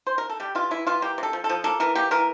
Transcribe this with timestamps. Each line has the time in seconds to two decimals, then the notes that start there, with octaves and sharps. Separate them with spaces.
0.07 C5
0.18 A#4
0.29 A4
0.40 G3 G4
0.55 E3 F4
0.71 E3 E4
0.87 E3 F4
1.02 A#3 G4
1.18 C3 A4
1.33 F3
1.44 A4
1.49 F3
1.64 A#3 A4
1.80 E3 A#4
1.95 A#3 G4
2.11 E3 A#4